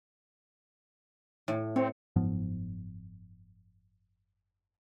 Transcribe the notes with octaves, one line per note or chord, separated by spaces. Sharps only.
A2
C4 C#5
F#1 G#2 F3 B3